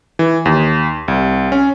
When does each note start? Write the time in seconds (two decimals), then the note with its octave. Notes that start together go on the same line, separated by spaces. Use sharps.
0.19 E3
0.45 D#2
1.08 C2
1.52 C#4